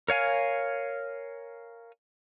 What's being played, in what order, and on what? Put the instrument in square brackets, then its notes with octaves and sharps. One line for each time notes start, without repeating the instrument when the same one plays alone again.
[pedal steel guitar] A#4 C#5 F5 G#5